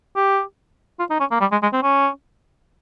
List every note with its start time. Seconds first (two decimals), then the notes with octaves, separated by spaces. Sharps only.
0.16 G4
0.99 F4
1.10 D#4
1.20 C#4
1.31 A#3
1.41 G3
1.52 G#3
1.62 G#3
1.73 C4
1.83 C#4